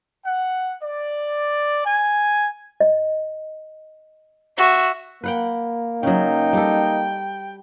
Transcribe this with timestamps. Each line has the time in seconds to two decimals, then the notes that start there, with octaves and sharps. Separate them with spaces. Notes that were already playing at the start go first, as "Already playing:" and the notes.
0.24 F#5
0.83 D5
1.84 G#5
2.80 D#5
4.57 F#4 E5
5.24 A#3 B4 F#5 G5
6.03 C#3 F#3 D#4 G5
6.53 G3 A4